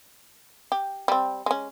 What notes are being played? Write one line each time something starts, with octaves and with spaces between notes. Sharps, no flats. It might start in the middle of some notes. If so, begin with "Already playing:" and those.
G4
G3 C4
G#3 C#4